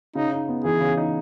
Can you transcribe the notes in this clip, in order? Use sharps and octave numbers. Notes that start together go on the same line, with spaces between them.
C#3 D#4
D#4
B3
E3 G#4
C#3
D#4